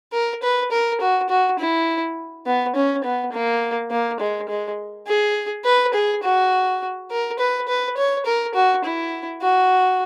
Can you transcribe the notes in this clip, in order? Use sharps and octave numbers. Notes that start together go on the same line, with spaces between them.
A#4
B4
A#4
F#4
F#4
E4
B3
C#4
B3
A#3
A#3
G#3
G#3
G#4
B4
G#4
F#4
A#4
B4
B4
C#5
A#4
F#4
E4
F#4